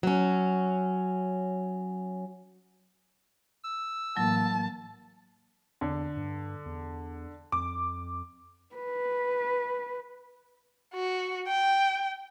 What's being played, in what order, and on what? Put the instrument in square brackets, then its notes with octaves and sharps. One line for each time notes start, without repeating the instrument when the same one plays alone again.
[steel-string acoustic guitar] F#3 C#4
[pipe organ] E6
[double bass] A1 A#3 [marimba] F#3 [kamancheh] A5
[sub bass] E2 [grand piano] D3
[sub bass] G2
E2
[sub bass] F2 [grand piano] D6
[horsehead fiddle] B4
[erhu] F#4
G5